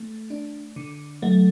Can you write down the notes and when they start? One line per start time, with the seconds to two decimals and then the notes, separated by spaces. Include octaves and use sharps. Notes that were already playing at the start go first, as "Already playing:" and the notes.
Already playing: A3
0.30 D4
0.76 D3
1.22 F#3 A3